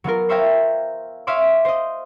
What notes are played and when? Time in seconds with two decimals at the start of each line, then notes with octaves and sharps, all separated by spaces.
0.04 F#3 B3 F4 A#4
0.29 C5 C#5 E5 F5 G5 A#5
1.27 C#5 E5 F5 C6 D6
1.65 C5 D#5